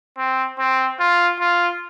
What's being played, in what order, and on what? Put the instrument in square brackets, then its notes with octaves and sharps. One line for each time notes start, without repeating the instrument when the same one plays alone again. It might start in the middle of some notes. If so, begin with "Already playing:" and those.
[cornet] C4
C4
F4
F4